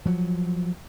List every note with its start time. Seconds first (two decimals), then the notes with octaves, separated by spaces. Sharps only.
0.06 F3 F#3